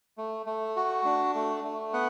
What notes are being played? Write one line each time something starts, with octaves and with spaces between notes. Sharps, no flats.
A3
A3
F#4
D4
A3
A3
B3 F#5